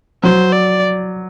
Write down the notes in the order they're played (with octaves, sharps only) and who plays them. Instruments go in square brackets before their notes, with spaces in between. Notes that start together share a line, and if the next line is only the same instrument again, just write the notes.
[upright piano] F#3 [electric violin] C5
[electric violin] D5